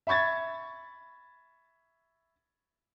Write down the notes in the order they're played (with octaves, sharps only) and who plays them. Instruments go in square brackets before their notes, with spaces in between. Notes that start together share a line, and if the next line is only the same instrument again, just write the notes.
[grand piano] E5 B5 C#6 G#6 A6